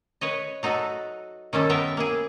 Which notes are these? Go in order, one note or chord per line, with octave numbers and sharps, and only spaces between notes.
B4 C#5 D#5
F#3 D#4 F#4 A4 B4
D#3 G3 C#4 A4
B3 A#4 E5 G5
A#3 E4 G#4